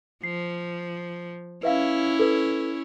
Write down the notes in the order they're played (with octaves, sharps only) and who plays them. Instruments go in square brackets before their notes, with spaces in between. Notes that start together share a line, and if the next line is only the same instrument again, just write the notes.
[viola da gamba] F3 [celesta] C7
[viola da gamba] C#4 E4 [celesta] B4 E5 F5
[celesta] A4 B4